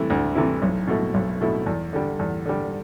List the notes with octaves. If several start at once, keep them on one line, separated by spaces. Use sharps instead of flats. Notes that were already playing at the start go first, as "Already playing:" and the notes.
Already playing: C3 E3 A3 E4
D2
C3 E3 A3 E4
B1
B2 A3 E4
B1
B2 A3 E4
E2
D3 G3
E2
D3 G3